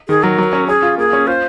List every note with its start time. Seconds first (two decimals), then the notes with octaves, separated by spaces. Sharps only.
0.08 D#3 G#4
0.23 F#3 A#4
0.38 F#3
0.53 C#4
0.68 C#4 G#4
0.83 F4
0.98 A#3 G#4
1.13 C#4
1.27 F4 C5